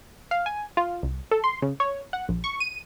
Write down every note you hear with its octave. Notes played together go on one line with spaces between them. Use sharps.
F5
G#5
F4
C2
A4
C6
C#3
C#5
F#5
A#1
C#6
D#7